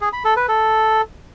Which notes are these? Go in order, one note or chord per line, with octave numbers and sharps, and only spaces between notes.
G#4
B5
A4
B4
A4